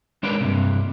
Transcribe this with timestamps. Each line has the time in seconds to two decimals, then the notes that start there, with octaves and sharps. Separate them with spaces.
0.23 G#3 D4 A#4 B4 C#5 D5
0.40 G2 C3